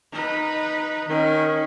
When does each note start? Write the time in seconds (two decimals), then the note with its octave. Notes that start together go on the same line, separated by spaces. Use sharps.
0.12 D#4 B4
1.08 D#3 C#4